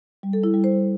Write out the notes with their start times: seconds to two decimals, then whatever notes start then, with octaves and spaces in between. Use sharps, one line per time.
0.23 G3
0.33 A4
0.44 E4
0.54 G3
0.64 C5